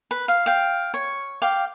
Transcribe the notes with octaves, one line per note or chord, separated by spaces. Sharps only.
B4
F5
F5 G5
C#5
F5 G5 D6